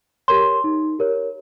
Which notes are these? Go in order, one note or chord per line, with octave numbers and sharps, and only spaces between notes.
G4 A#4 C#5 C6
D#4
G4 A#4 C#5